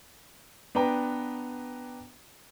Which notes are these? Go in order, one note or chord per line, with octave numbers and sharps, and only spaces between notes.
B3 D4 B4 G5 A#5